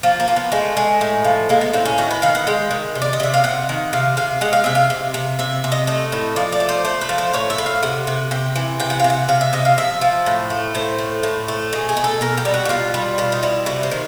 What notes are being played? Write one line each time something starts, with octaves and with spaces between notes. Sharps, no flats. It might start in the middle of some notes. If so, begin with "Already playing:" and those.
F3 A#3
A#3
F3
B3
G#3 A3
G#3
A2
F3
G#3 A#3
B3
A2 C4
C#4
D#3 F#4
B4
D#3 F5
F#5
G#3 G5
D#3
C3
D5
D#5
C3 E5
F5
C3 F#5
D#3
C3 F5
C3 F5
G#3 F#5
F5
C3 E5
F5
C3
C3
C3 E5
C3
D#5
A3 D#5
A2
F3 D5
D5
A3
C5
A3 C5
B4
F3
C5
A2 C#5
E5
A2
F5
C3 F#5
C3
C3 G5
E3
C3 G5
F#5
C3 F5
F#5
C3 F5
E5
C3 D#5
F5
F3 E5
F3
A2
A3
A2 C5
A3
A2
A3
B2 G#4
G#4
B2
A4
B2 A#4
G4
G3
F#4
F#4
B2 F4
G3
B2 F4
D#4
G3 E4
C3 F#4
C5
D#3